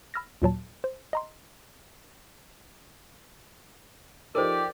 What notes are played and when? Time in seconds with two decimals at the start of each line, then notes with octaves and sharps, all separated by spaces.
0.14 B5 E6 F6 A6 A#6
0.42 D#2 A#2 F#3 A5
0.84 C5
1.13 D#5 A#5 C6
4.35 F3 D#4 G4 A4 A#4 C5 D5